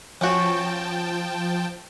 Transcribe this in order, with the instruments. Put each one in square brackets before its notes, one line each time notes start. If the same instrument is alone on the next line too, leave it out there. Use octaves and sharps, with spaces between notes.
[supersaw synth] F3 G5 A5 [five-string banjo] C#4 F#4